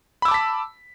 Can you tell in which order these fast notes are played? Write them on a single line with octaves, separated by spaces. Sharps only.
B5 E6 D6 A5 B6